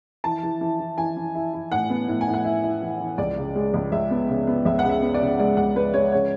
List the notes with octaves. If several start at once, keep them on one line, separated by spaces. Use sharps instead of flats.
E3 A5
E3
E3
E3
E3 G#5
E3
E4
E4
A2 F#5
B3
A2
G#5
A2
F#5
E4 E5
E4
E3
E3
C#2 D5
C#3
G#3
C#2
C#2 E5
B3
C#3
B3
C#2 E5
F#5
C#3
E5
B3
D5
C#3
G#3 D5
C#2 F#5
G#3 B4
G#3 C#5
C#3 C#5